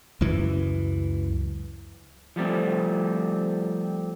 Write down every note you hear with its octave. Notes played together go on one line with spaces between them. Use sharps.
C#2 F#2 E3
F3 G3 A3 C4